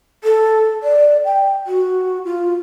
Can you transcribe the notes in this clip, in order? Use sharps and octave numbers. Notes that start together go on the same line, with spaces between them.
A4
D5
G5
F#4
F4